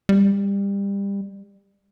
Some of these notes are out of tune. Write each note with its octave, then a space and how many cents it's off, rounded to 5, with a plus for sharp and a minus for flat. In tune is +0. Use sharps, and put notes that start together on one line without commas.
G3 +25